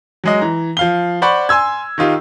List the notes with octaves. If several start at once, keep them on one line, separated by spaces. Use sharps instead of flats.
F#3 G#3 D#5
E3 A#5
F3 F5 G7
C5 D5 F#5 B5 C#6
G#5 C6 E6 G#6
D#3 D#4 F4 G4